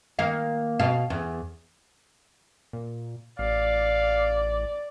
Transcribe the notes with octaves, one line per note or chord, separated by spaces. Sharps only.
D#3 A#3 F5
B2 F5
E2
A#2
A1 D5 F5